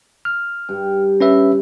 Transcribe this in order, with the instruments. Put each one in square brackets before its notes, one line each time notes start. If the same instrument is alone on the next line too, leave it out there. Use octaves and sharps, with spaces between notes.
[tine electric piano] F6
[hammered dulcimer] G2
[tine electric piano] C#4 B4 E5